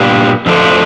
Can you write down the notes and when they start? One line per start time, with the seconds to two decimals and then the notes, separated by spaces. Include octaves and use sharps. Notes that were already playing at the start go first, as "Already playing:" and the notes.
Already playing: A#2 G3 B3 D4 G4
0.46 F2 D3 F3 A3 D4